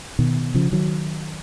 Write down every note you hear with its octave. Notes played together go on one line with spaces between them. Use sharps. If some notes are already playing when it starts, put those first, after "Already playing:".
B2 D#3
C#3 F3
D#3 F#3